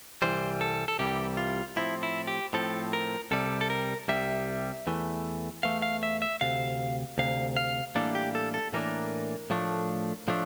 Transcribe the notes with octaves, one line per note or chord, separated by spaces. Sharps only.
C2 C3 E3 G3 C5
A4
A4
C2 C3 E3 G3 G4
F4
A2 F3 C4 E4
E4
G4
A2 F3 C4 A4
A#4
C2 C3 G3 A4
A4
A#4
C2 C3 G3 E5
E2 E3 A3
E2 E3 A3 F5
F5
E5
E5
D2 C3 F5
D2 C3 F5
F5
A2 E3 G3 A#3 D4 A4
G4
A4
A4
A2 E3 G3 A#3 D4 A#4
A2 F3 A3 D4
A2 F3 A3 D4